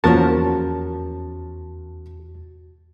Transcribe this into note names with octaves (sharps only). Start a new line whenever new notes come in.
E2 F3 A#3 C#4 F#4 A#4 A5